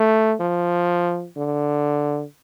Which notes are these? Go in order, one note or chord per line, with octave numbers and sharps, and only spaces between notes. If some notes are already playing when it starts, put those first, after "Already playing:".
Already playing: A3
F3
D3